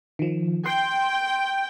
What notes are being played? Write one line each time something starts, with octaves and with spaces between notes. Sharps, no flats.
D#3 F3
G5 C6 G6